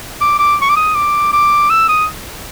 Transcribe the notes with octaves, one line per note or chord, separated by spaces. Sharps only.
D6
D6
C#6
D6
D#6
D6
D6
E6
D#6